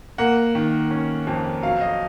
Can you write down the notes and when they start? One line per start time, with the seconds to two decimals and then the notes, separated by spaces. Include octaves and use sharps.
0.18 A#3 F#5
0.55 D#3
0.91 C#4
1.27 F2
1.63 F#3 F5
1.81 D#5